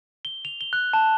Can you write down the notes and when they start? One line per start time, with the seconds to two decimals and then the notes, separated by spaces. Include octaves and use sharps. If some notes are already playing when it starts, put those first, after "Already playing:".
0.25 G7
0.45 F7
0.61 G7
0.73 F#6
0.93 A5